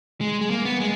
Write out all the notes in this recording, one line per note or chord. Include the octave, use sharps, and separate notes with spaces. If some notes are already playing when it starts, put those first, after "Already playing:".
G#3
G#3
A#3
B3
G#3